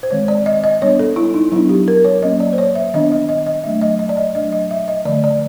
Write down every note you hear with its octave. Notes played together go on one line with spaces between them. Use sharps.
C5
D#3 G#3 C4 C#5
D5
D#5
D#5
G3 B3 D4 C#5
A4
E4
D#4
F#3 B3 D4 E4
G4
A#4
C#5
F#3 A#3 C#4 D#5
D5
C5
C#5
E5
D#3 G3 B3 D4 D#5
D#5
D#5
D#5
F#3 A3 D4 E5
D#5
D#5
D5
D#5
F#3 A3 D4 D#5
D#5
E5
D#5
D3 F3 A3 D5
D5